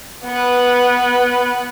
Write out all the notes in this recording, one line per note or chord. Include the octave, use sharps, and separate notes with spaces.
B3 B4